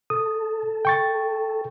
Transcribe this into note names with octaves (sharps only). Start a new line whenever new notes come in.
A4 D#6
G5 C#6 A6